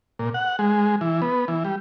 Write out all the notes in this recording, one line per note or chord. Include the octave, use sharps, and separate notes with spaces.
A#2
F#5
G#3
E3
B3
E3
G3